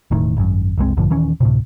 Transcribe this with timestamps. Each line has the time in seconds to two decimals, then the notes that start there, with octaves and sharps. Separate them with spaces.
0.11 E1 A2 D#3
0.37 G#1 F#2
0.78 F#1 C2 G#3 C4
0.97 A#1 G2 D3 F3
1.10 D#1 D#3 E3 C#4
1.40 D2 A2 C3